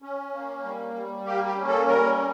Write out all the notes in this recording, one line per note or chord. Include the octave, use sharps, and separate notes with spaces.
C#4
A#3
G3
G3
A#3 G4
G4
C#4
A4
G3 A#4